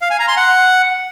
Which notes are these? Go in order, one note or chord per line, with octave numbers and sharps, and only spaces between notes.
F5
G#5
A#5
C6
F#5